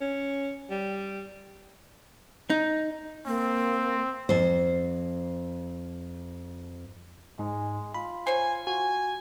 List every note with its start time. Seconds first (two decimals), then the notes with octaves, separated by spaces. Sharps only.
0.01 C#4
0.70 G3
2.50 D#4
3.26 A#3 C4
4.29 F2 C5
7.39 G#2 G#3
7.94 F4 B5
8.27 C5 C#5 G#5
8.67 F#4 G#5